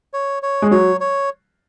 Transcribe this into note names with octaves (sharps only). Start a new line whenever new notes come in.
C#5
C#5
G#3
F#3 C#5
C#5